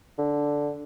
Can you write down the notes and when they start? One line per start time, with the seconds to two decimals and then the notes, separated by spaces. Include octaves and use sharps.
0.18 D3